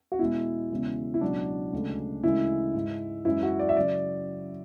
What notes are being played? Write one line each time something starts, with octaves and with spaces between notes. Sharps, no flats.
F#4
E2 B2 G#3 E4
E2 C#3 E3 G#3
E4
C#2 B2 F#3 D4
D2 C#3 G#3
D2 C#3 E3 G#3 E4
G#2 G#3
F#2 E3 G#3 E4
F#4
D5
E5
C#3 F#3 D5